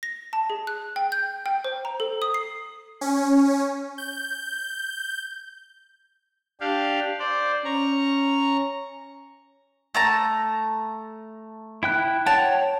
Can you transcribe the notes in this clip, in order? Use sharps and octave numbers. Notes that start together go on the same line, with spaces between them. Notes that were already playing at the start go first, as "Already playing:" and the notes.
A#6
A5
G#4
F#6
G5
G6
G5
C5
A#5
A4
D#6
C7
C#4
G6
D4 G4 F5
C5 D5
C#4 A#5 C#6
A3 A5 A#5
E4 G5 F#6
C#5 F#5 G5 A5